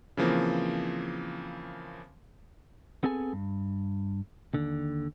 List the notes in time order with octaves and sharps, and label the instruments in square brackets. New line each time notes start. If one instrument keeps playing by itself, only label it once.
[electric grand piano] C#3 E3 F3 A#3 C4
[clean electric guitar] B3 C4 G#4 A4 G#5
G2
D#2 D3